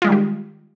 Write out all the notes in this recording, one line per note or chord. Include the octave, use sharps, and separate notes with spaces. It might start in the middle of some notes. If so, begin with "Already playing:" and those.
D#3 G3 G#3 F4 G4